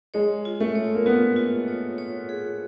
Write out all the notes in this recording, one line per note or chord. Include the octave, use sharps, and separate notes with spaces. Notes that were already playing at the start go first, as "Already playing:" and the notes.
G#3 C#5
F4
A3
C#5
A#3
B3 F4
F4
C#5
C#5
G#4